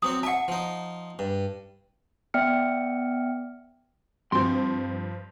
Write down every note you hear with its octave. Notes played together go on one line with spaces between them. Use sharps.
F#3 C4 F#4 D#6
E5 F#5 A5 C#6
F3 D#4
G2
B3 D5 E5 G5 F6 C#7
G2 F3 C4 C6